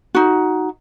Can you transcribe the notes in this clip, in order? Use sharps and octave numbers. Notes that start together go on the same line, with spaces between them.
D#4 F#4